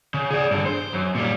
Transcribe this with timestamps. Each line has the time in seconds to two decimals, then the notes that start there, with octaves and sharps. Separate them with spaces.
0.14 C#3
0.31 G#4 D5
0.51 G2 D3
0.65 C5
0.93 F#2
1.15 A#2 G3